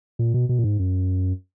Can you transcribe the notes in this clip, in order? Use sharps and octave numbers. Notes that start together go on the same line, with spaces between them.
A#2
B2
B2
A#2
G#2
F#2